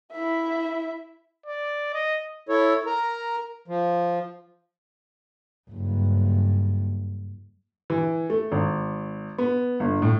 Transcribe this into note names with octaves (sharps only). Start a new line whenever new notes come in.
E4 E5
D5
D#5
E4 A4 C#5
A#4 A#5
F3
F#1 G2
E3
A3
G#1
B3
G1
A2